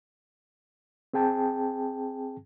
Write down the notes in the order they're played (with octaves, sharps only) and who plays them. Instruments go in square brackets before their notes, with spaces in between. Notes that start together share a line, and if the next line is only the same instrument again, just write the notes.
[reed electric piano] C4 G#4 G5 A5